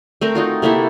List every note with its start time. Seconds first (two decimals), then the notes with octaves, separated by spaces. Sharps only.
0.21 A3 C4 A#4
0.35 D#4 F4 F#4
0.62 C3 A#3 E4 A4